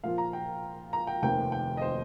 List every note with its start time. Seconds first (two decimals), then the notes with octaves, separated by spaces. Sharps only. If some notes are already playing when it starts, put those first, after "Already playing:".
0.03 A#2 F3 A#3 F4 F5
0.18 A#5
0.33 G5
0.93 A#5
1.07 G5
1.23 F1 D#2 D#3 C4 G5
1.52 G5
1.77 D#5
1.82 C5